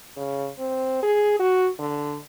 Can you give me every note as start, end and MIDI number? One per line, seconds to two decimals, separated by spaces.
0.17 0.49 49
0.59 0.98 60
1.03 1.37 68
1.39 1.68 66
1.80 2.17 50